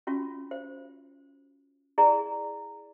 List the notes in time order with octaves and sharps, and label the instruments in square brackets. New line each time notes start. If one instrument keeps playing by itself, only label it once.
[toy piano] C#4 F4 F#4
C5
E4 G#4 D5 A#5